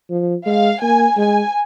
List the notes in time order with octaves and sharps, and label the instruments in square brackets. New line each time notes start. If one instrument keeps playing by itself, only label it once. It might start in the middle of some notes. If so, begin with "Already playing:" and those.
[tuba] F3
[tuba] G#3 [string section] F5
[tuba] A#3 [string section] G#5
[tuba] G#3 [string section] G#5